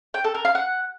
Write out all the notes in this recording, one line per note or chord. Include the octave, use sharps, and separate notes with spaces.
G5
A4
A#4
F5
F#5